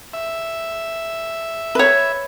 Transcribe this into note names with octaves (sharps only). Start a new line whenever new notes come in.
E5
B4 C#5